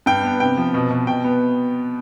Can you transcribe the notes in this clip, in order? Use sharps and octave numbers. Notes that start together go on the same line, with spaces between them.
G2 G5
B3
C3 G5
F3
B2
B2
B2 G5
B3